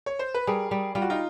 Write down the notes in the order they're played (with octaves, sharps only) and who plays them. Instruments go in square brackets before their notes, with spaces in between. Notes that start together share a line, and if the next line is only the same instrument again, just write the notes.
[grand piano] C#5
C5
B4
[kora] G3 [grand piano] G#4 A#4
[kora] G3
[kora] G3 [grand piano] F4
[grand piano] F#4
D#4 F4